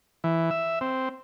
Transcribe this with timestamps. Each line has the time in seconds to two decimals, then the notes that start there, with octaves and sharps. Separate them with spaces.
0.24 E3
0.51 E5
0.81 C4